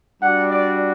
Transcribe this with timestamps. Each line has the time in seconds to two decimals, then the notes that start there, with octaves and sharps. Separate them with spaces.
0.22 G3 D4 F#4 F#5
0.51 D5